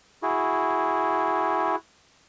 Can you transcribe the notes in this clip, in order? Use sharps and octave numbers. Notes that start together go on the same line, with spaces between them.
E4 F#4 G#4